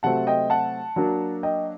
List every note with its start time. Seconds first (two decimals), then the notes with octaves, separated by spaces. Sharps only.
0.03 C3 F#3 A3 C4 F#5 A5
0.27 D#5 G5
0.50 F#5 A5
0.96 F#3 A#3 D4
1.43 D#5 G5